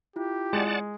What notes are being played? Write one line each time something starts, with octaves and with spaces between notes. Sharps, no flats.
E4 F4 G4
G#3 D5 F#5 A5